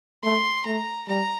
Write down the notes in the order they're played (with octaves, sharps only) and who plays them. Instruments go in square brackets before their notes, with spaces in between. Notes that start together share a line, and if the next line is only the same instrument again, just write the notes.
[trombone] A3 [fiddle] C6
[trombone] A3 [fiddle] A#5
[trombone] G3 [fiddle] A#5